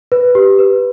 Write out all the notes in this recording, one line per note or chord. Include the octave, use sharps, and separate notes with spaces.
B4
G4
B4